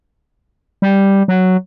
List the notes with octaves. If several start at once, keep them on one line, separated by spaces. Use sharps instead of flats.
G3
F#3